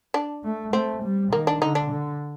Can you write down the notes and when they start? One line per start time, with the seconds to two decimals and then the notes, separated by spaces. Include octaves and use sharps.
0.14 D4
0.44 A3
0.73 A3 C4
1.03 G3
1.32 D#3 A#3
1.47 D4
1.61 D3 D#4
1.75 D4
1.90 D3